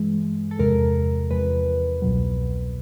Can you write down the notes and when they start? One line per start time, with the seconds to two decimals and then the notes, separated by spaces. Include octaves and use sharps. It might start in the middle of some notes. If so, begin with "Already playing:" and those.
Already playing: G2 E3 G#3
0.51 A4
0.59 E2 C3 F3 G#3 A#4
1.31 E2 C3 F3 G#3 B4
2.02 C2 B2 F#3